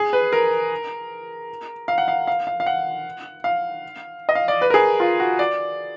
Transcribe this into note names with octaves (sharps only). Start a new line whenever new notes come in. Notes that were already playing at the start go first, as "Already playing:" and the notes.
Already playing: G#4
B4
A#4
F5
F#5
F5
F5
F5
F5
F#5
F5
D#5
F5
D5
B4
A#4
G#4
F4
F#4
D5